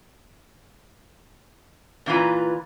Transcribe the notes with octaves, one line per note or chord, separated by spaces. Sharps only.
A#2 E3 F4 B4 A#5